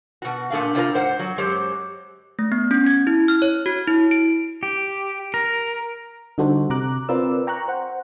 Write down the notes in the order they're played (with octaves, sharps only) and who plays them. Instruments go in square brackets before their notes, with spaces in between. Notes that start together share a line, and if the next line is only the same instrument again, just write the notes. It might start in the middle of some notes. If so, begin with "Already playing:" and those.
[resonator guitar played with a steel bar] B2 F#4
A#2 A3 D4 F5
C3 D4 F4 B4 C5 A#5
G#2 C5 F#5
F#3
F#2 F#3 G#3 G4 C5
[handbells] A3
B3
C#4
G#6
E4
F6
C#5
F#4
E4
D7
[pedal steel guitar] G4
A#4
[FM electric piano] D3 G3 D#4 F#4 A4 C5
C3 A#5 D6 F#6
C4 F4 A#4 B4 D5 E6
G5 A#5 C#6 F#6
C5 F#5